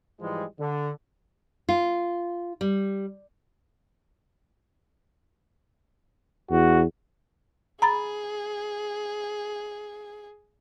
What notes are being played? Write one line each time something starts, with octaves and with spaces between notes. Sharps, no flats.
G#2 E3 F3 G3 G#3
D3
F4
G3
E2 F#4
G#4 A#5 B5 A6